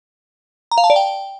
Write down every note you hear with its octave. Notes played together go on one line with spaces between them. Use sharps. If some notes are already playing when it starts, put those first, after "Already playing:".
A#5
F5
A5
D5
G5